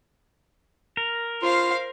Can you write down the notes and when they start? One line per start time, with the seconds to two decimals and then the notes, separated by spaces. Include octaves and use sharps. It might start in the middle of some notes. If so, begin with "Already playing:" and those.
0.97 A#4
1.43 F4 C5 F5